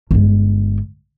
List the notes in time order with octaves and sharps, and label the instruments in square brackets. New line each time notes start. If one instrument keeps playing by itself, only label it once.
[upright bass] G1 G#3